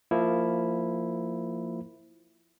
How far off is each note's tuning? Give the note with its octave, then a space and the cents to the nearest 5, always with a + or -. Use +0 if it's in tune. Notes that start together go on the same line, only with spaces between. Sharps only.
F3 +0 A#3 -15 E4 +0